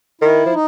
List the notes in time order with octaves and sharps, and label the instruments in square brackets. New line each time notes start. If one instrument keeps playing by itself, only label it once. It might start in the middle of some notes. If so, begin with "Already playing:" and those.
[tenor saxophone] D#3 [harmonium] E4
[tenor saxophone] F3
[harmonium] D#4